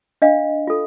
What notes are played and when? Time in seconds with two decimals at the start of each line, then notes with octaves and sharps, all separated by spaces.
0.22 D4 D#5 F5
0.67 F4 A4